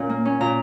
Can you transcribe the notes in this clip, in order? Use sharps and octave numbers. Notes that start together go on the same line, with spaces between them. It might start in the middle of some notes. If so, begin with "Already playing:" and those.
Already playing: A#2 C#4
A#3
C#4
A#2 A#5